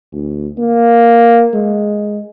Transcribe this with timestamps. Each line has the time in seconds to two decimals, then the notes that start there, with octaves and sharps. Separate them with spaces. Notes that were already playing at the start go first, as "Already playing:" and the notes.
0.13 D2
0.59 A#3
1.54 G#3